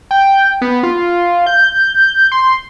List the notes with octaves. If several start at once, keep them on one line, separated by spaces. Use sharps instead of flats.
G5
B3
F4
G6
C6